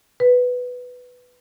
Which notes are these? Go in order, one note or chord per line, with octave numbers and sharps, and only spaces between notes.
B4